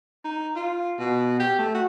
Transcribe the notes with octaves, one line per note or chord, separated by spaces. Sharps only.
D#4
F4
B2
G4
A3
F#4